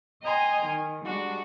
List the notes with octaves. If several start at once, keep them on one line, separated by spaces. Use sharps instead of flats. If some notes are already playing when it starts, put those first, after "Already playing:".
D#5 G5 G#5 A#5 C6
D#3
G3 G#3 D4 F#4